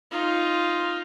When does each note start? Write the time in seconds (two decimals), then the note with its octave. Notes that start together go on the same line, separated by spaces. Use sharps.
0.11 D#4 F4